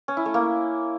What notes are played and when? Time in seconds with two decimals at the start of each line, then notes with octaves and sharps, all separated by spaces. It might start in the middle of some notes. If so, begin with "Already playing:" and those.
0.08 C#4
0.17 E4
0.26 A3
0.34 A#3